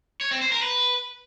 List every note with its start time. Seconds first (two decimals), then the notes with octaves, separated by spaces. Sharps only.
0.21 C#5
0.31 C4
0.41 C5
0.52 A#4
0.62 B4